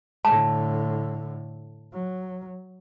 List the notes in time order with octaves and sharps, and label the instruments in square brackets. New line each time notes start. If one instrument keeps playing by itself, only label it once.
[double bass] A2 D3 [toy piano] A5
[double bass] F#3